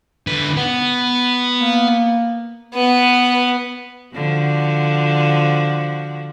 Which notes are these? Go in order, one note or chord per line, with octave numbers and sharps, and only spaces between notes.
D3 B4
B3
A#3
B3 B4
D3 F3 F#4